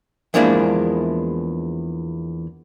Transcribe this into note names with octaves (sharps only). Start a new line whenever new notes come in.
E2 F3 G#3 A#3 D4 E4